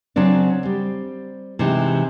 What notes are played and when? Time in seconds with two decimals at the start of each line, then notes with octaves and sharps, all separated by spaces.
0.16 C#3 F#3 C4 D4
0.63 G3 C4
1.59 C3 E3 G#3 D#4